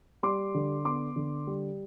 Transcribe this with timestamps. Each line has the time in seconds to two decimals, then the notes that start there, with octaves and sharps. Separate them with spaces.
0.23 G3 C6 D6
0.54 D3
0.85 B3 C6 D6
1.16 D3
1.47 G3